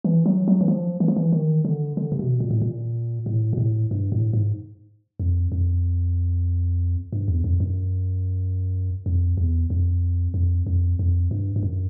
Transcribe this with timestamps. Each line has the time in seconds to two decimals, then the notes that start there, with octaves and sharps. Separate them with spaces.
0.04 E3
0.26 F#3
0.48 F#3
0.61 E3
0.68 F3
1.00 E3
1.08 F3
1.16 E3
1.32 D#3
1.65 D3
1.97 D3
2.12 C3
2.19 B2
2.40 A#2
2.51 A2
2.62 A#2
3.26 A2
3.53 A#2
3.58 A2
3.91 G2
4.12 A2
4.33 G#2
5.20 F2
5.52 F2
7.13 G2
7.28 E2
7.44 F2
7.60 F#2
9.06 F2
9.37 E2
9.70 F2
10.34 F2
10.67 F2
10.99 F2
11.31 G2
11.56 G2
11.63 F#2